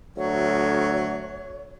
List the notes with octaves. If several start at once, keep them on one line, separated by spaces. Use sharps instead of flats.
D2 F#3 C#5